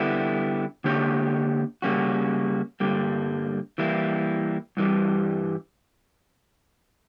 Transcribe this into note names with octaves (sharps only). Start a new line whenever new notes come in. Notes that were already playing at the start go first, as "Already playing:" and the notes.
Already playing: D3 G3 B3 E4
D3 A#3 D4 G4 C#5
C#3 G3 A#3 C#4 F#4
G2 D3 G3 A#3
E3 G3 A#3 E4
G2 E3 G3